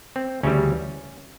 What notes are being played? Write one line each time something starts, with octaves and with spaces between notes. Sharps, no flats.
C4
D2 C#3 E3 G3 C#4